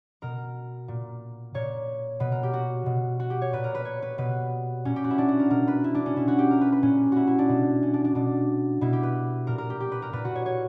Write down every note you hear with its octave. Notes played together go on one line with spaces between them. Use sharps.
B2 A#4
A#2
A#2 C#5
B2 B4
A#4
G4
F#4
B2
F#4
G4
C#5
A#2 B4
A#4
B4
C#5
B4
B2 B4
A#2 C#4
G4
F#4
E4
D4
F#4
A#4
B2 A#4
B4
E4
D4
C#4
B2 E4
F#4
G4
A#4
B4
B4
A#2 C#4
E4 F#4
E4
D4
B2
C#4
D4
D4
B2 D4
B2 E4
G4
B4
A#2 A#4
A#4
G4
G4
B4
A#4
A#2 B4
F#4
C#5
C#5